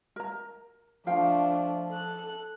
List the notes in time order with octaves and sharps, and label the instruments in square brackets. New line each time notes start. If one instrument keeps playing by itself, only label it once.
[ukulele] A#4 A#5
[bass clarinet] F3 [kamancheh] A3 D4 [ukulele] F4 F5 G5
[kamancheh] A4 F#6